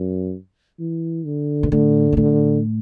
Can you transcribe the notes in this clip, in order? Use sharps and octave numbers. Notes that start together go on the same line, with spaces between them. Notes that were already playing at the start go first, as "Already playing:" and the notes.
Already playing: F#2
E3
D3
B2
A2 D3
B2
A2 D3